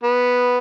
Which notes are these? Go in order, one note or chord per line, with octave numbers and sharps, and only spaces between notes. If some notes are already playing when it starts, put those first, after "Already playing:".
B3